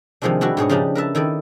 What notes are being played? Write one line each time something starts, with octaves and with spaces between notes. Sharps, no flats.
C3 D#3 F3 G#3 C4 D4
G3 D4 E4 F#4
G#2 B2 G#4 C#5
C#3 F3 D4 D#4 G4 A5
A#4 B4 E5 A5
D#3 E4 A4 D5